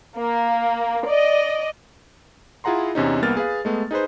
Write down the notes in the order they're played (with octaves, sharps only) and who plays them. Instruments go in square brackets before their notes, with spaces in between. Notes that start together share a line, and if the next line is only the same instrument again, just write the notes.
[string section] A#3
D5 D#5
[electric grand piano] E4 F4 G#4 F#5 A#5 C6
E2 C3 C#4 D#4
C2 A#3 B3 F6 A6
G#4 B4 F5
G#3 A3 B3
D#4 G#4 B4 C5